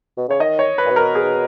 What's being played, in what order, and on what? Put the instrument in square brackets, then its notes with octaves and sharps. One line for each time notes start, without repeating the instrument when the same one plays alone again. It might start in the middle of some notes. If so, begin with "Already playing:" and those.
[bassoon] B2
[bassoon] C#3 [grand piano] C#5
[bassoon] D#3 [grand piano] D#5
[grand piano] C#5
B4
[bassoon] A#2
B2
[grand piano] A#4
G#4